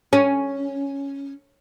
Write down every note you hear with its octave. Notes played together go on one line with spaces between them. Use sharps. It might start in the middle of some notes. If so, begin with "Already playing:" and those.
C#4